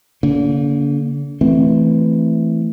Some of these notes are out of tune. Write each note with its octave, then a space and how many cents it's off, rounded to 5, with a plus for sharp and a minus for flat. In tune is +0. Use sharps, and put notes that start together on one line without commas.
D3 -45 A#3 +0
E3 +0 A3 +0 C4 +0